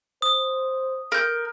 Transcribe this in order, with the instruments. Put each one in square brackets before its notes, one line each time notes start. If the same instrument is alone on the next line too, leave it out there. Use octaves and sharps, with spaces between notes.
[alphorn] C5 [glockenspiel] D#6
[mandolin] A#4 G6